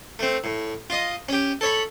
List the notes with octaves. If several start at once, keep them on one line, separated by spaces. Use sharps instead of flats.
A3 C4
A2
F4 D#5
C#4 G4
A4 C#5 B5